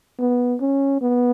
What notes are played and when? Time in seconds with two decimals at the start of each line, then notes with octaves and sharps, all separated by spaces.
0.19 B3
0.61 C#4
1.01 B3